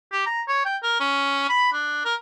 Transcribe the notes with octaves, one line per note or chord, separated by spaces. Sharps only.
G4
A#5
C#5
G5
A#4
C#4
B5
D4
A#4